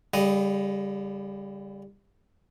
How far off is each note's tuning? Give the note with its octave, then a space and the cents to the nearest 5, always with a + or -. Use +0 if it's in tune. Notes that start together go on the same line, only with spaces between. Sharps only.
D3 -40 G3 +20 D#5 +0